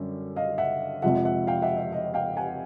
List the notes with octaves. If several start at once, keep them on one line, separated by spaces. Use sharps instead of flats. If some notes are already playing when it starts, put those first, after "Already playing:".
Already playing: F#2 D3 G3 C#4
D#5 F5
E5 F#5
F2 C3 F3 G#3 E5 F#5
E5 F#5
F5 G5
E5 F#5
E5
D#5
F5 G5
F#5 G#5